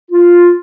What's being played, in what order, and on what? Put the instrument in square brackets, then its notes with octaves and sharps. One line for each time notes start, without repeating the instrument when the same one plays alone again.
[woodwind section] F4